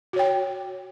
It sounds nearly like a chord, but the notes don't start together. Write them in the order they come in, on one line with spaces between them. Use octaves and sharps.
F#4 C#5 G5